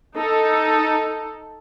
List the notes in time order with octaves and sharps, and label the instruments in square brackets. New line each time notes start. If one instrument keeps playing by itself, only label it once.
[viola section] D#4 A4